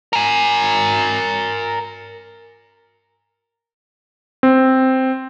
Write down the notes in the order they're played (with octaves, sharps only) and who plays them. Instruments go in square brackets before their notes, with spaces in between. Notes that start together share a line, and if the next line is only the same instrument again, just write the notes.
[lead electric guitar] A#4 G#5
[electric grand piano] C4